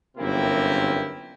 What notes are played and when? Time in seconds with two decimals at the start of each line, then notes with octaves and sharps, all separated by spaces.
0.17 G1 F#2 C3 A#3 E4 G5